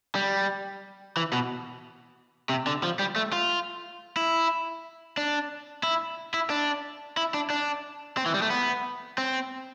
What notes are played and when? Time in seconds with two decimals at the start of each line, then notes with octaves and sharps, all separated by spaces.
0.15 G3
1.17 E3
1.33 B2
2.49 C3
2.67 D3
2.83 F3
2.99 G3
3.16 A3
3.33 F4
4.17 E4
5.17 D4
5.83 E4
6.34 E4
6.50 D4
7.17 E4
7.34 D4
7.50 D4
8.17 C4
8.26 E3
8.34 G3
8.42 A3
8.50 B3
9.18 C4